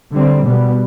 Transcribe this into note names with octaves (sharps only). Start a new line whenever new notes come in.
D3 G3 C4
B2 G3 B3